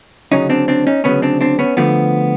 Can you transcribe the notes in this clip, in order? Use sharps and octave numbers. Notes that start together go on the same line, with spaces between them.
D2 C#3 F#3 C#4 D#4
C4 D4
C4 D4
C#4 D#4
D2 C#3 F#3 B3 C#4
C4 D4
C4 D4
B3 C#4
D2 D3 F3 A3 B3